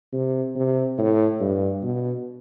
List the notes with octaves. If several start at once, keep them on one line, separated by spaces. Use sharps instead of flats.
C3
C3
A2
G2
B2